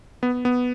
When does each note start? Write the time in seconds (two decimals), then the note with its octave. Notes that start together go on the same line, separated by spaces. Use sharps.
0.23 B3
0.45 B3